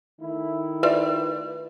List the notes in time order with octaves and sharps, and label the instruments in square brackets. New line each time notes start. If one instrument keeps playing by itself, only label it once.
[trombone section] D#3 A3 E4
[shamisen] F4 D5 E5 [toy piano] B4